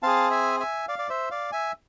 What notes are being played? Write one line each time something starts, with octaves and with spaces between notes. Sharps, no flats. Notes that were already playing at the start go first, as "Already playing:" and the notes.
C4 G#4 F5 A5
E5 G#5
E5 G#5
D5 F5
D5
C5 E5
D5 F5
E5 G#5